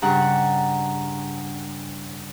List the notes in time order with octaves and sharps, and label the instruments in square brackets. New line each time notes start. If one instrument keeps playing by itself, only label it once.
[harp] G2 C#3 D4 F#5 A#5